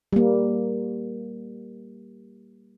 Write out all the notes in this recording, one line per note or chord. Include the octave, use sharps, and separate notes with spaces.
G3 A#3